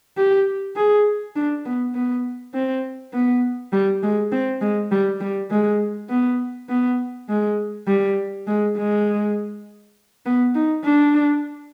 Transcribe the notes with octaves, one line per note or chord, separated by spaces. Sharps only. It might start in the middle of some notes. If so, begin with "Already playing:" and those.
G4
G#4
D4
B3
B3
C4
B3
G3
G#3
C4
G#3
G3
G3
G#3
B3
B3
G#3
G3
G#3
G#3
B3
D#4
D4